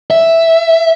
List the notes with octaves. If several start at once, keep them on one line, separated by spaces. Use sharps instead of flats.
E5